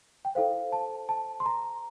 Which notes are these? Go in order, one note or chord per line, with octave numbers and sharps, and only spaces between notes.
G5
E4 A4 C5 F5
A5
A5
C6
A#5